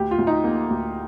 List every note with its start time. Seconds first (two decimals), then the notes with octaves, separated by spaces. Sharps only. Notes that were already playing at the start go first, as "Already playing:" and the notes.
Already playing: D2 G4
0.11 F4
0.19 D2
0.27 D#4
0.44 A#3
0.70 D2